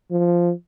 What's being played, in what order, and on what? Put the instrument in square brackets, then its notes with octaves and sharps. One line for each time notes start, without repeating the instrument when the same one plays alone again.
[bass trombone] F3